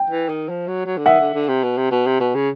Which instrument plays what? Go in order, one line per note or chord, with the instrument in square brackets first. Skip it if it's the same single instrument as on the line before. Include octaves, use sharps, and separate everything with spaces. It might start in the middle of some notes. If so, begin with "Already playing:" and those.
Already playing: [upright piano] G5
[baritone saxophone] E3
D#3
F3
F#3
F#3
D3
[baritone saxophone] D#3 [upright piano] E5 F#5
[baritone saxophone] D3
D3
C3
B2
C3
B2
C3
B2
C#3